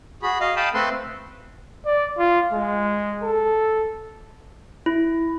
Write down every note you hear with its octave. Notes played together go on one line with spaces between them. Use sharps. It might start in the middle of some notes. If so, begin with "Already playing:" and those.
F#4 G#4 B5
D#5 F5
F5 G5 A5 B5 D#6
A3 C4 A4 B4 C6
D5
F4
G#3
A4
E4